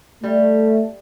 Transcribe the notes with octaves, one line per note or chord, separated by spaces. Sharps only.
G3 A3